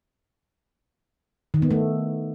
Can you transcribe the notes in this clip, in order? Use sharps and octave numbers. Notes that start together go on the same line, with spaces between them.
D#3
B3
A3